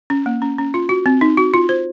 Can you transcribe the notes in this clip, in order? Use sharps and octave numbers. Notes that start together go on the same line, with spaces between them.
C#4
A#3
C#4
C#4
F4
F#4
C4
D#4
F#4
F4
C5